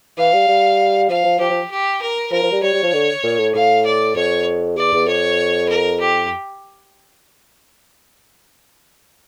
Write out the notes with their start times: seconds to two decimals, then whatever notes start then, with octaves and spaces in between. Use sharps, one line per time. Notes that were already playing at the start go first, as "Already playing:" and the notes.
0.18 E3 F5
0.33 G3
0.48 G3
1.10 F3 F5
1.25 F3
1.40 F3 G4
1.50 F3
1.71 G4
2.01 A#4
2.32 F3 A#4
2.43 F3
2.52 G3
2.63 G3 C#5
2.73 G3
2.83 F3
2.93 D3
3.24 A#2
3.39 A2
3.54 A2 F5
3.85 D5
4.16 F2 C#5
4.77 E2 D5
4.93 E2
5.07 F2 C#5
5.69 A#4
6.00 G4